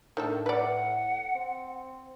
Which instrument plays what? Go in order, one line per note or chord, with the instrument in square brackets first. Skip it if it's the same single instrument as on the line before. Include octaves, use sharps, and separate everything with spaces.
[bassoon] A2 [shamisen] D#3 D4 A4
[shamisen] B4 D5 [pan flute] F#5
[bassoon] C4